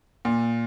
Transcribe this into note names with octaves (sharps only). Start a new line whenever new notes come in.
A#2